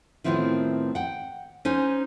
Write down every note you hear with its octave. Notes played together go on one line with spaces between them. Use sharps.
A2 D#3 B3 C4 E4 F4
F#5 G5
C#4 D#4 C5 G#5